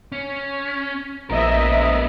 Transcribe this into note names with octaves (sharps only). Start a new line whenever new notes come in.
C#4
A#1 B3 A#4 D#5 E5